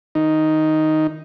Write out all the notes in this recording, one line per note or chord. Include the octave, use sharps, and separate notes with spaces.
D#3 D#4